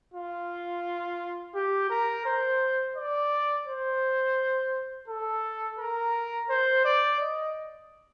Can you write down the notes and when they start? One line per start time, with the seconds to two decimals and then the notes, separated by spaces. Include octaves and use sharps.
0.14 F4
1.55 G4
1.90 A#4
2.26 C5
2.96 D5
3.67 C5
5.08 A4
5.79 A#4
6.50 C5
6.85 D5
7.20 D#5